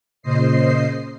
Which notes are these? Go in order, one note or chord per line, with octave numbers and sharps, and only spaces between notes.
A#2 C#3 C5 D#5 C7